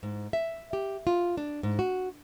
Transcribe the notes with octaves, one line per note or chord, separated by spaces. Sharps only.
G#2
E5
G4
F4
D4
G#2
F#4